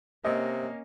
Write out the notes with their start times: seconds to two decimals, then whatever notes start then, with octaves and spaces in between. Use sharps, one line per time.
0.25 C3 A#3 C#4 D#5